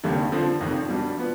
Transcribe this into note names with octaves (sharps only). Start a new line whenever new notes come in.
F1 D#2 D3 G3
D3 F3 C4
F1 F2 D#3
B2 G3 D4
F3 B3